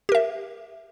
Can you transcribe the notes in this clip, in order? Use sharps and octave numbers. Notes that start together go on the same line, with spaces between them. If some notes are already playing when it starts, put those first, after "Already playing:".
G4 A#4 E5